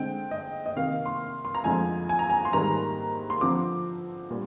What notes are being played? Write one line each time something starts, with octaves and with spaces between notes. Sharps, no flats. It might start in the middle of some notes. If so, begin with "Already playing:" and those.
Already playing: D3 G#3 C4 G5
D#5
D#5
C3 D#3 A#3 F5
C6
C6
A#5
F2 D3 F3 G#3 C4 G#5
G#5
A#5
G#5
C6
G#2 D#3 G3 A#3 A#5
C6
D3 F3 C4 D6
A#2 G3